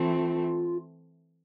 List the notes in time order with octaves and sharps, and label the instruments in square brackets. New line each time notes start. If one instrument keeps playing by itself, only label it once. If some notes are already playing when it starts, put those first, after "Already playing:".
Already playing: [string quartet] E3 A3 C4 [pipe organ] F4